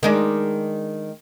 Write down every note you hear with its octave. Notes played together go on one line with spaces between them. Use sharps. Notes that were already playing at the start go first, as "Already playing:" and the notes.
D#3 G#3 D4